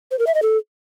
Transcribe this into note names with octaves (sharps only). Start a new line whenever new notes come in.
C5
A#4
E5
D#5
A4